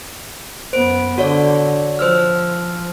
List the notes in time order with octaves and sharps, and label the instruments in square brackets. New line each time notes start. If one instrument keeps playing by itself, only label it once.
[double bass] F#2 B3 [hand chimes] C5 D7
[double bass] D3 [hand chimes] F#4 C#5 D5
[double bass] F3 [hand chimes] C5 E6 F6